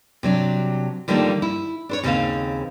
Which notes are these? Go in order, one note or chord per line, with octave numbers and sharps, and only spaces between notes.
C3 F#3 D4
D3 D#3 F3 G3 A3 A#3
E4
D4 C5 C#5
D#2 C#3 C4 A4 C5 F5